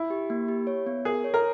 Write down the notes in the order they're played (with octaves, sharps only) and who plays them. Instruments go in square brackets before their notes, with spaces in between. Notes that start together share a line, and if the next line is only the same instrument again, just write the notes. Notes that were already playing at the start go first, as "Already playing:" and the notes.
Already playing: [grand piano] E4
[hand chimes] G4
A#3
G4
C#5
B3
[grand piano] G#4 [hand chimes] A#4
[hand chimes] C#5
[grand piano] A#4